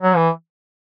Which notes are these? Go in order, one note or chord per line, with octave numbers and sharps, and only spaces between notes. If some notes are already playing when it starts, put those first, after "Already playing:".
F#3
E3